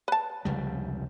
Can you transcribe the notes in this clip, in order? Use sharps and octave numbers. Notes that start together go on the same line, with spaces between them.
B4 A5
F1 C#2 G3